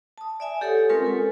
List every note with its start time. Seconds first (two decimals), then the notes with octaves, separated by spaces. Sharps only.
0.18 A5 D#6
0.40 D5 E5 G#5
0.61 G4 A4 C#5 F#5 D#6
0.90 G#3 C4 C#4 F4 A#4 B4
1.04 A4 G#5